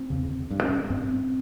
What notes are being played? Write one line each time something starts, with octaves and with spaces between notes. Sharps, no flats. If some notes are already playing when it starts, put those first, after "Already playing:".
Already playing: C4
E2 C#3
G2
C#4
G2 C4